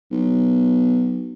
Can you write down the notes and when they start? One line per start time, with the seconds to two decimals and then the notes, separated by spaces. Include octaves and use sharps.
0.11 B1